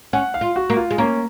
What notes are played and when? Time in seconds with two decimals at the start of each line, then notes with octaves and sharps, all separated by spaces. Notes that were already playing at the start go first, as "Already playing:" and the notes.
0.13 C#4 F#5
0.34 F5
0.41 F4
0.56 F#4
0.70 A#3
0.77 F4
0.91 G#3
0.98 A#3 C#4